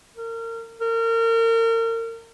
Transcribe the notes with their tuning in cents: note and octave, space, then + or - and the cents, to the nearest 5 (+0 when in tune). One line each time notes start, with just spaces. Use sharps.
A#4 -30
A#4 -35